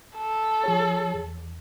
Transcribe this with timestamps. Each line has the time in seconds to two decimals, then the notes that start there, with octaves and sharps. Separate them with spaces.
0.18 A4
0.64 F3 G#4 C#5
1.14 E2